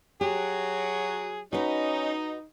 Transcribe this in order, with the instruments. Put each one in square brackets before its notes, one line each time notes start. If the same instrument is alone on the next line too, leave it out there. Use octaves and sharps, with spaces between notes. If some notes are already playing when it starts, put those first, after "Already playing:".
[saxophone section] F#3 [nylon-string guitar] G4 [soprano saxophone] G#4
[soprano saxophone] C#4 [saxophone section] D#4 [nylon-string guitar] F#4 B4